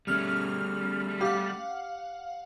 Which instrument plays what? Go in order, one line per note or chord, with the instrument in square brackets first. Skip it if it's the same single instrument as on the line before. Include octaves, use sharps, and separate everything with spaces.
[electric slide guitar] G3 A3 [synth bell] C#4 F6 F7
[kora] G4 [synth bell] F5 F#5